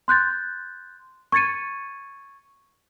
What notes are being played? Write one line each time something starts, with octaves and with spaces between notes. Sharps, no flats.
C6 F#6 G6 A6
C#6 G#6 A6 C#7 D#7